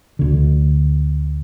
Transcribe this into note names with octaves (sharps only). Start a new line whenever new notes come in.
D2 D3